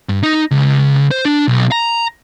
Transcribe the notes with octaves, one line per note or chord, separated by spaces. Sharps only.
G2
D#4
C#2
C5
D4
B1
A#5